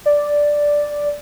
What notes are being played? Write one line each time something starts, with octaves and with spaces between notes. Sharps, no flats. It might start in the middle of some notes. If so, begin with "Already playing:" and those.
D5